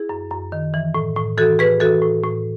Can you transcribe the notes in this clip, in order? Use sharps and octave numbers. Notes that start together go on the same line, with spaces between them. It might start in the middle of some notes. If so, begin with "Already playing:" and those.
Already playing: E4 G#4
F#2
F#2
D#3
E3
A2
A2
E3 F#4 A4
A2 G#4 B4
E3 F#4 A4
A2
A2